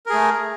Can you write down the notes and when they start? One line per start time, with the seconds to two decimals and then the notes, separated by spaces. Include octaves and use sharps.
0.06 A#4
0.10 G#4
0.13 A3